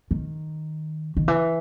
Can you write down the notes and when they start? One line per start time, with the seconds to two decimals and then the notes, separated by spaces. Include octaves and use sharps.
0.11 D#3
1.17 D#3
1.28 E3